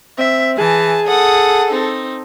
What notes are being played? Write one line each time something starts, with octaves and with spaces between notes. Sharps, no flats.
C4 E5
E3 G#4 A5
A4 F#5 D#6
C4 D#4